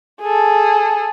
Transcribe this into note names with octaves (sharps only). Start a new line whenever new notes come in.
G#4 A4